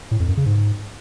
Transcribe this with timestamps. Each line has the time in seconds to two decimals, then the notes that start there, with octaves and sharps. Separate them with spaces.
0.11 A2
0.20 F2
0.29 F#2
0.37 C#3
0.46 G#2